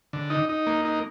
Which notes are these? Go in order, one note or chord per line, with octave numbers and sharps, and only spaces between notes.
D3
D#4
D#4
A#3
D#4